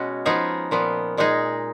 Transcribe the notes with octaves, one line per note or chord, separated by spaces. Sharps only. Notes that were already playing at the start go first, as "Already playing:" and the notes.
Already playing: B2 G#3 C#4 F#4
F3 B3 D#4 G#4
A#2 F3 B3
A#2 G#3 D#4 G#4